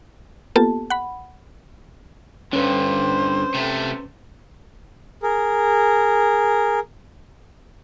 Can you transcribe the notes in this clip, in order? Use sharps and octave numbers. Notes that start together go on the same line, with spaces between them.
A#3 B3 F4 G4 A4 A5
F#5 B5
G2 D3 C#4 B4 C5
C3 A3
G#4 A#4